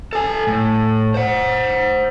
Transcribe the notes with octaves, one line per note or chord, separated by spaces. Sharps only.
A4 G#5
A2
C5 F#5